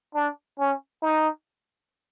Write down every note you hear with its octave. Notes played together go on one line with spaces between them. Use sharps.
D4
C#4
D#4